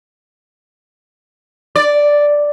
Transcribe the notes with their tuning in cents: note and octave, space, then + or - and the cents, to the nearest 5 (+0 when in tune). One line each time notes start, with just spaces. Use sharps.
D5 +0